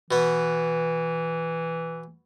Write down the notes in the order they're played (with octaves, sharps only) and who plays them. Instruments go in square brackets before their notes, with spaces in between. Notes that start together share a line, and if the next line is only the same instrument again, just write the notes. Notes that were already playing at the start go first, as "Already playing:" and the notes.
[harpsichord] B2 B3 [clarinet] E3